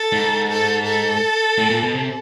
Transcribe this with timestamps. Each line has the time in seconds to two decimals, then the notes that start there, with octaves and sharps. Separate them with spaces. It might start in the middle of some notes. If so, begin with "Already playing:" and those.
Already playing: A4
0.12 G#2
0.48 A4
0.85 A4
1.58 A2
1.70 A#2
1.83 B2
1.95 C3